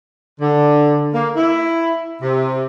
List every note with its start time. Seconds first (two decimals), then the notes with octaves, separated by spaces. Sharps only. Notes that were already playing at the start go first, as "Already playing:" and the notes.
0.41 D3
1.14 A#3
1.37 E4
2.22 C3